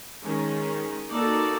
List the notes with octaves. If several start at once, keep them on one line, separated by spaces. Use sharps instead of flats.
D#3 G#3 C#4
A#3 D#4 F#4 A4 D5